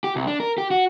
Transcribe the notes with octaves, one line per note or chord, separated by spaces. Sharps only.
G4
C2
D4
A#4
G4
F#4